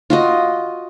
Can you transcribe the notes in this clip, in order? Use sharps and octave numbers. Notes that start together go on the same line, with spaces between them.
F4 F#4 D#5